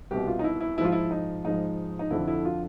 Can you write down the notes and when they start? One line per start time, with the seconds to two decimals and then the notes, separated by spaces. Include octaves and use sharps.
0.11 C2 B2 G4
0.27 F4
0.39 D#4
0.44 E4
0.61 E4
0.77 G#2 E4
0.81 F3 F4
0.92 E4
1.11 D#4
1.45 G#2 F3 D#4
1.99 D#4
2.10 F2 D3 F3 E4
2.28 E4
2.45 F4